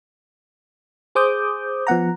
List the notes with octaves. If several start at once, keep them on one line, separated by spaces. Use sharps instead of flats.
G#4 C5 D6 D#6 G6
F3 B3 F#5 A#5